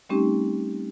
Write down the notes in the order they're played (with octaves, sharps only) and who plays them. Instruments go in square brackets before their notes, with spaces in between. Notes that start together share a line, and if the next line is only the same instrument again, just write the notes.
[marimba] G3 A3 C4 C#4 D#4 G4